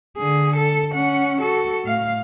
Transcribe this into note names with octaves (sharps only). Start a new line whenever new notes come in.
D3 G#4
A4
C#4 F#5
F#4 A4
A2 F5